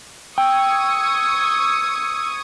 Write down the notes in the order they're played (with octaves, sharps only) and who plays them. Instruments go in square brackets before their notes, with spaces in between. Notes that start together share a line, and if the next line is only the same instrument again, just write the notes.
[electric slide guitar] G5 [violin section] C#6 D#6 G#6 [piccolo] E6